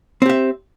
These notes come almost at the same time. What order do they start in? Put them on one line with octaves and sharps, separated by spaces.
C4 G4 E5